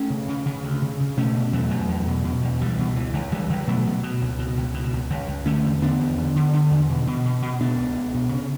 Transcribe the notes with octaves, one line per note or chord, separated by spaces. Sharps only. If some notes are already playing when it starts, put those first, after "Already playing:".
Already playing: A3 C#4
C#3
C#3
C#3
D2
C#3
C#3
B2 A3 C#4
B2
E2 F#3 A3
E2
E2
B2
B2
E2
C#2 E3 G3
B2
C#2 E3
C#2
C#2 E3 G3
C#2
B2 F#3 A3
B2
B2
C#2
B2
C#2
B2
C#2
C#2
C#2
D3 A3 C#4
E2
D3 B3 D4
E2
D3
D3
D3
E2
B2
B2
B2
B2
B2 B3 D4
C#2
C#2
B2
C#3